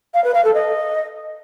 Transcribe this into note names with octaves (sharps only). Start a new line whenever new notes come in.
F5
B4
F5
A4
D#5